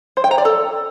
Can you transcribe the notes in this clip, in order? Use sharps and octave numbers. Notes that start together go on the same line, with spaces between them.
C5
G5
A#5
D5
A4